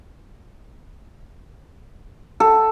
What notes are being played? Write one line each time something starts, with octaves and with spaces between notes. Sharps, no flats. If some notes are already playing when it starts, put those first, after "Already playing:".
A4